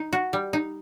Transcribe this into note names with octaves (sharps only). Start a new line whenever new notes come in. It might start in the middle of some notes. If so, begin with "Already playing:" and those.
Already playing: D#4
F#4
G3
D#4